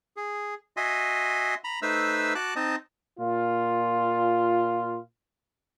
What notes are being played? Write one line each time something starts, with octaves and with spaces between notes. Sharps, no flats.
G#4
F#4 D#5 E5 G#5 C6
A#5 B5
A3 D#4 B4 C5 E5 E6
F#4 A5 D6 F#6
C4 D#4 D#5 A5
A#2 F4